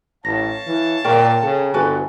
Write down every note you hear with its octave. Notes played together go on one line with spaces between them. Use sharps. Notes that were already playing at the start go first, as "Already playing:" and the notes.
A1 C#5 F5 A5 A#6
E3
A#2 A#4 D5 G5 C#6
C#3 A4
G1 F#4 A4 B4 G#5